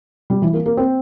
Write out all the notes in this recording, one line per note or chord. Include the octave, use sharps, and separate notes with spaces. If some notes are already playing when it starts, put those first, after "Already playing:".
G3
E3
A#3
A#3
C4